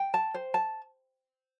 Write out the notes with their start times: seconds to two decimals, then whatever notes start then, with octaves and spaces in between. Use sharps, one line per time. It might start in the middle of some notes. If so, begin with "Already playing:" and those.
Already playing: G5
0.14 A5
0.34 C5
0.54 A5